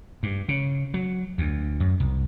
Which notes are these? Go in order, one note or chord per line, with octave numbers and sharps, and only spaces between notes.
G2
C#3
F#3
D2
F#2
C2